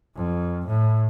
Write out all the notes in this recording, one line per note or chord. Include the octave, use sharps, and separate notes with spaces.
F2
A2